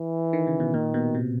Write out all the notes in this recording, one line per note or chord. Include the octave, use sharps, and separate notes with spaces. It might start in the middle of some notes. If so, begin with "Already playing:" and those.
Already playing: E3
D#3
C#3
B2
A#2 D#3
B2
C3